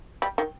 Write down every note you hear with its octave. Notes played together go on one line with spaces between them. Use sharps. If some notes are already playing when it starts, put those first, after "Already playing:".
G3
D#3